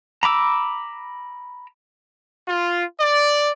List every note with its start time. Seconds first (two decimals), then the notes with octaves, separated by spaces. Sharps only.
0.23 A#5 B5 D6 E6
2.48 F4
2.99 D5